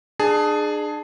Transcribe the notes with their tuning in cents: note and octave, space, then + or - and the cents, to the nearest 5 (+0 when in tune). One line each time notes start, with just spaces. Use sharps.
D4 +40 G#4 +5 A5 +0